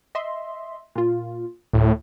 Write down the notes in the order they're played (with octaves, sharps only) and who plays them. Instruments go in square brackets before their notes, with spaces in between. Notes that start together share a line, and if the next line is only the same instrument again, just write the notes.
[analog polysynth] D#5 E5 C6
A#2 F4
[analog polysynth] D2 [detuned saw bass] A2